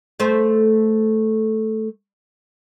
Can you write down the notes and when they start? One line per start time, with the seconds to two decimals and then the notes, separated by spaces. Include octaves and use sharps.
0.20 A3 C5